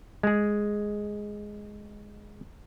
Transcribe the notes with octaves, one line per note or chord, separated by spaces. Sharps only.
G#3 G#4